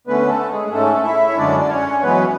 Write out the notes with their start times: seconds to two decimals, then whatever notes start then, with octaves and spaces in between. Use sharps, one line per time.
0.07 D3 A3 B3 C#4 B4
0.28 A3 A4
0.50 G#3 G#4
0.72 G#2 G#3 A3 C#4 A4
1.04 E4 E5
1.28 C#5
1.37 F#2 D3 G#3 C#4 D4 D5
1.60 D5
1.70 C#4 C#5
2.02 F#2 E3 G#3 B3 C#4 B4